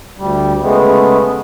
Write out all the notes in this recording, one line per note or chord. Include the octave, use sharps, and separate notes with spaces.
D2 G3
C#3 G#3 A3 B3